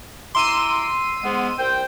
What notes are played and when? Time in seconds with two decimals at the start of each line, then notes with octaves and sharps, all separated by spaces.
0.35 E4 A#5 C6 D6 E6 D#7
1.23 G#2 G#3 B3
1.58 C2 C5 G5